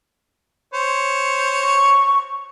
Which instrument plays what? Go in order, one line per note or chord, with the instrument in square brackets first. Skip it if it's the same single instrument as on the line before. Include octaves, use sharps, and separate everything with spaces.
[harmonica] C5 C#5
[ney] C#6